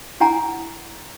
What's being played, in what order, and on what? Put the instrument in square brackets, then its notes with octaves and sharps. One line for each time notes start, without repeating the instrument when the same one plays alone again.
[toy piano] D4 E4 F#5 G#5 A#5